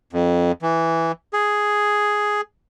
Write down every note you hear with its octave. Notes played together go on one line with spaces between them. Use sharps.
F2
E3
G#4